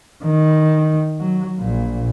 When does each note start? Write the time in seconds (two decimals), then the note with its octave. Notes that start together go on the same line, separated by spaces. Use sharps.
0.24 D#3
1.20 F#3
1.58 A#1 A#2